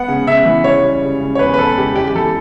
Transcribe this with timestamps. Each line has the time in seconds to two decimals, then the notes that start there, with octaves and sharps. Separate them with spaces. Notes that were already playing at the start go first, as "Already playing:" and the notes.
Already playing: B3 F#5
0.08 C#3
0.27 C#3 E5
0.46 E3
0.64 C#3 C#5
0.83 G3
1.02 C#3
1.20 C#3
1.35 C#5
1.39 E2 B4
1.54 B4
1.58 E2 A4
1.78 C#3 G4
1.96 E2 G4
2.08 G4
2.15 E3 A4